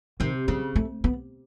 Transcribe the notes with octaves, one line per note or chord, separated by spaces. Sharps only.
C3 D#3
C#3 G3
A3
B3